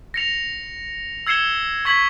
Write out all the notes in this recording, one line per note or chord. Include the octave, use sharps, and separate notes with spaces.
A#6 C#7 F7
E6 G#6 C7 C#7 E7 G7
C#6 G#6 B6 F#7